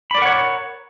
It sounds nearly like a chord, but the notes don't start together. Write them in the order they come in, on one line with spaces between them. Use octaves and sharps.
B5 D5 A#4 F#5 C#5